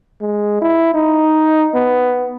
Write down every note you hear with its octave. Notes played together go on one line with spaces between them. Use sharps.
G#3
E4
D#4
B3